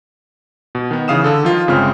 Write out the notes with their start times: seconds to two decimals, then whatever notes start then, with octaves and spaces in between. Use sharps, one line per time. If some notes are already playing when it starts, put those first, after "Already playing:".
0.75 B2
0.91 D#3 B3
1.08 C#3 E3 F5 D#6 E7
1.24 D3 A4
1.43 D#3 F3 F4 A#4
1.68 G1 C#3 G#3 C4 F4 F6